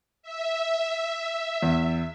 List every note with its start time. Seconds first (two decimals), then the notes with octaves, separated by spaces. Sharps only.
0.23 E5
1.62 E2